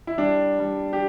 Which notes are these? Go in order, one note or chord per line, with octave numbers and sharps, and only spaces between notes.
E4
G3 D4
G3
G4